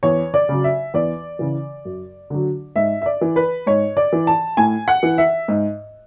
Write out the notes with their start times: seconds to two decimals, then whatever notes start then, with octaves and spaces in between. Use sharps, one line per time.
0.03 E2 C#5
0.34 D5
0.49 C#3 F#3
0.64 E5
0.94 E2 D5
1.39 C#3 E3
1.85 F#2
2.30 D3 F#3
2.76 G#2 E5
3.01 E5
3.06 D5
3.21 E3
3.36 B4
3.66 G#2 C#5
3.97 D5
4.12 E3
4.27 A5
4.57 A2 G#5
4.88 F#5
5.03 E3
5.18 E5
5.48 G#2